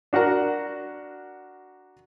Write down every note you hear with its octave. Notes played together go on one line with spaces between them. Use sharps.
D4 F#4 A#4 F#5